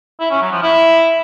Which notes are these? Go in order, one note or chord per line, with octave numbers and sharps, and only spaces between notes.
E4
C#4
F#3
F3
E4